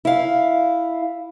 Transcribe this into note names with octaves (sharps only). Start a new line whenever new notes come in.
E4 F5